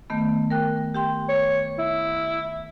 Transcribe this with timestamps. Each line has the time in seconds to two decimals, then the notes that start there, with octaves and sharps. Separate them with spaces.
0.10 D#3 A3 B3
0.50 A#4 G5 F#6
0.94 G4 G5 C6
1.29 C#5
1.79 E4